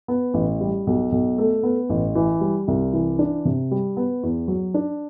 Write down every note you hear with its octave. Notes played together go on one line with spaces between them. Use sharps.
B3
A1
G3
B1
B1
A3
B3
A1
E3
G3
C2
E3
D4
C3
G3
B3
E2
F#3
D4